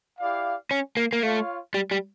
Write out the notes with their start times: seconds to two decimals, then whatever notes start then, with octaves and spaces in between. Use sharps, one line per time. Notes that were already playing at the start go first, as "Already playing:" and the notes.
0.19 E4 G4 D5 F5
0.71 C#4
0.97 A#3
1.13 A#3
1.23 A3 F4 C#5 F5
1.74 G3
1.91 G3